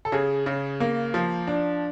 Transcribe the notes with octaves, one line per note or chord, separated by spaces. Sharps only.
A4
C#3 G#4
C#3
A#3
F3
D4